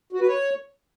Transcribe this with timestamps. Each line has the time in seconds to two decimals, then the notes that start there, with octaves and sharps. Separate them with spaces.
0.12 F#4
0.20 B4
0.28 C#5